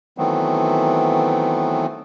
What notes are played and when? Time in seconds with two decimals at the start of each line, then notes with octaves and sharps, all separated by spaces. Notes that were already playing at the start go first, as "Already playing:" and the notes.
0.18 D#3 E3 F#3 A3 B3 C4